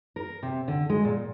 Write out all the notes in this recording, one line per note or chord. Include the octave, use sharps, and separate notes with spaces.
A#4
C3
D3
G#3
A#2